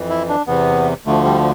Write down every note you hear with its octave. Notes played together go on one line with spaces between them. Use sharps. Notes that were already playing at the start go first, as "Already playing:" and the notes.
Already playing: F2 E3
E4
D4
E2 C3 E3 B3
D2 D3 F3 A3
G3